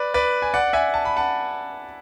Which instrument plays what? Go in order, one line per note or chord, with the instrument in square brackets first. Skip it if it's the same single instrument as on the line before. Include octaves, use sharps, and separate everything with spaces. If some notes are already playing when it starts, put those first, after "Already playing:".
Already playing: [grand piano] B4 D5
B4 D5
G#5
D5 F#5
E5 G#5
A5
B5
F#5 A5